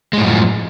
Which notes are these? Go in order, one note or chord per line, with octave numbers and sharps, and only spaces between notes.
F#2 A2 F3 G#3